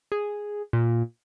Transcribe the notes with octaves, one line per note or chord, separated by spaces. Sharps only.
G#4
A#2